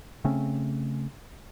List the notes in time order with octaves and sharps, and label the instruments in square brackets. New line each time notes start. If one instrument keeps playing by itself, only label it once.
[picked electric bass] C#3 A3 C4 C#4